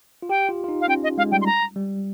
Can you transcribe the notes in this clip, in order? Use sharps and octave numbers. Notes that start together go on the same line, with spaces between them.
F4
G4 G5
F4
F4
D#4
F5
C#4 G5
D#5
G#3 F5
G3 G5
C6
A#5
G3